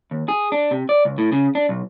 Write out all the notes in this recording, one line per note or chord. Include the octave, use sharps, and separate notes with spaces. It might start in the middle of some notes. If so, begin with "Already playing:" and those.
D#2
G#4
D4
C3
D5
C#2
A2
C#3
D4
B1